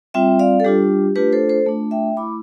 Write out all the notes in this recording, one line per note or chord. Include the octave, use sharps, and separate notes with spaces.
G3 C4 F4 E5 G5
D5 F5
A4
G3 D4 F4 G4
A3 D4 F4 G4 B4
A4 C5
A4 C5
A3 D4 F4
E5 G5
A3 E4 B5 D6